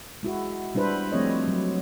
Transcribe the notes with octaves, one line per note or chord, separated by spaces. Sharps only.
G#3 E4 F#4
G3 D4 E4 B4 C5
F3 A3 C4 G4 C#5 D#5
F#3